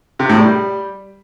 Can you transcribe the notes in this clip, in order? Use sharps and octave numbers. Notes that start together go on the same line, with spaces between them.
C3
A2
G3